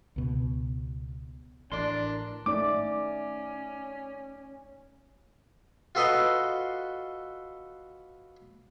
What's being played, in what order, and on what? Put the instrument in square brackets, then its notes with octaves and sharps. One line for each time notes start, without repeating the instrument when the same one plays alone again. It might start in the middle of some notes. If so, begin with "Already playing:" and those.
[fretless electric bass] C#2 B2
[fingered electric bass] A1 [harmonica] D4 [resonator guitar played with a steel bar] A#4 D5 [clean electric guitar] C6
[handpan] A3 D#4 D5 [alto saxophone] C#4 [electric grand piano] D6
[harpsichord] F4 F#4 A4 B4 D#5 C6